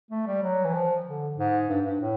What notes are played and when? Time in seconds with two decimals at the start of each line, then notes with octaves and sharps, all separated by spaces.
0.11 A3
0.27 G3
0.43 F#3
0.64 E3
0.74 F3
1.06 D3
1.37 G#2
1.69 G2
1.86 G2
2.01 A2